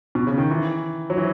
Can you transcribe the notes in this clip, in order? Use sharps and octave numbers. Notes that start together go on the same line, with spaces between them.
B2
C#3
D#3
E3
F#3
E3